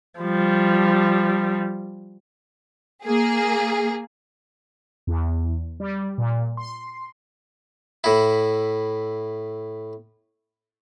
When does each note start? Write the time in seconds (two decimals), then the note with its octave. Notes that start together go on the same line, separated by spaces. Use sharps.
0.20 F3 G3
3.03 A#3 G#4
5.07 E2
5.80 G3
6.18 A#2
6.57 C6
8.04 A2 E4